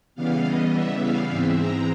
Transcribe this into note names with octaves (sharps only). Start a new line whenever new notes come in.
C#3 E3 G3 B3 F5
D#5
E5
F5
G#2 E3 G#3 C4 E5
A#5